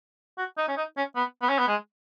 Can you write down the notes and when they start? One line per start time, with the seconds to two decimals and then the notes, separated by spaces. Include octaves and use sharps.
0.38 F#4
0.58 D#4
0.68 C#4
0.77 D#4
0.97 C#4
1.16 B3
1.42 B3
1.50 C#4
1.59 B3
1.68 G#3